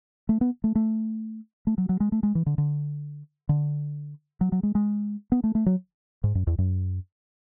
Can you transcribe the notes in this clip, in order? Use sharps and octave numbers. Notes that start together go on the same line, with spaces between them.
A3
B3
A3
A3
A3
F#3
F#3
G#3
A3
G#3
E3
D3
D3
D3
F#3
F#3
G#3
G#3
B3
A3
A3
F#3
G#2
F#2
E2
F#2